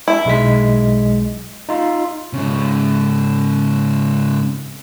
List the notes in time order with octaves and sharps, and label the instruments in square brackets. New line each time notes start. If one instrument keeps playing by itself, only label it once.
[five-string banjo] E4
[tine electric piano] B1 G#3 B6
D#4 F4
[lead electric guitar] G#2 C#3